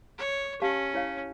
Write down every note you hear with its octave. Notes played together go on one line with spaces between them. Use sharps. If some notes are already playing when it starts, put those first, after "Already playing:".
C#5
C#4 G4 F5 A5
E4 C#5 F5